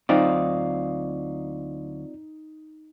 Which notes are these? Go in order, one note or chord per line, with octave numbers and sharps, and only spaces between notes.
D2 F#3 C4 D#4 F4 D5 F5